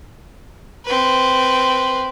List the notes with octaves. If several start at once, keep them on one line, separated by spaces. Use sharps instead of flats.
C4 B4